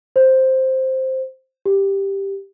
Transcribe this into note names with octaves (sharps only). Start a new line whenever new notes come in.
C5
G4